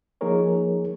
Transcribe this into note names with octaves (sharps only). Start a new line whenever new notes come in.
F3 A#3 D#4 G#4 A#4 C#5